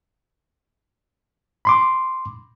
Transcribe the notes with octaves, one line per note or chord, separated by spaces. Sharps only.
B5 C6 D6